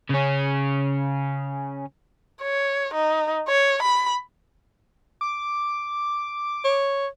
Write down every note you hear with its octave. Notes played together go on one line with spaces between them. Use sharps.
C#3 C#4
C#5
D#4
C#5
B5
D6
C#5